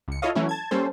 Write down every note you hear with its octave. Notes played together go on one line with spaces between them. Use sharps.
C#2 C#7
E4 F4 A4 C#5 D#5 F5
E3 F#3 A3 C#4 E4
A5 G#6
G3 A#3 C#4 A4 C5